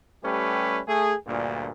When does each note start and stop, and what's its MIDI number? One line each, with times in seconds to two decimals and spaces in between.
0.24 0.80 55
0.24 0.80 57
0.24 0.80 61
0.24 0.80 67
0.24 0.80 71
0.88 1.14 57
0.88 1.14 68
1.27 1.71 38
1.27 1.71 43
1.27 1.71 46